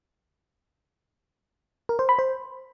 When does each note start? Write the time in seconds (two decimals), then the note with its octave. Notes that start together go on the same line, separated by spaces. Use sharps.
1.89 A#4
1.99 C5
2.09 B5
2.19 C5